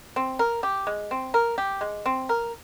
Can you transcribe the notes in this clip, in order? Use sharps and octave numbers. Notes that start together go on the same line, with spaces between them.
C4
A#4
G4
G#3
C4
A#4
G4
G#3
C4
A#4